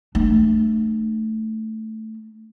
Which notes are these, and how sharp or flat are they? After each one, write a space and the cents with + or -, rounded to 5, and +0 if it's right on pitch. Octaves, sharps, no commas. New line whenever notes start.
A3 +0 D4 +40